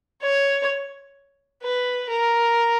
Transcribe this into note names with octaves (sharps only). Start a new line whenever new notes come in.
C#5
B4
A#4